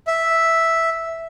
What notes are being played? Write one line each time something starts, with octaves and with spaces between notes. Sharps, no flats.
E5